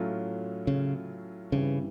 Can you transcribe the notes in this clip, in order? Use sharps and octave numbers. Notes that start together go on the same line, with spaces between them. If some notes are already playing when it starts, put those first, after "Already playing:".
Already playing: A2 F#3 A3 C#4 F4
C#3
G2 C#3 E3 G3 C4 E4